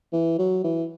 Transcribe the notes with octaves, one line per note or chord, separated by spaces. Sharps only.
E3
F#3
E3